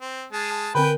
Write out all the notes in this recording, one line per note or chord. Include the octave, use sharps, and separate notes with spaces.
C4
G#3 A5
D3 C4 A#4 B4 G5 B5